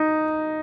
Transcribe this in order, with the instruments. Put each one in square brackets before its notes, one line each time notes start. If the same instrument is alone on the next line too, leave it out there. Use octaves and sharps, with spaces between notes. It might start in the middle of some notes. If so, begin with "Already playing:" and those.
Already playing: [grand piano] D#4